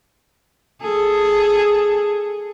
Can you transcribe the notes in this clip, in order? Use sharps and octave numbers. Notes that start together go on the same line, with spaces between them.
G#4 A4